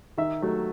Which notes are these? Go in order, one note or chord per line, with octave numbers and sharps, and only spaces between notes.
D#3 E5
F#3 A3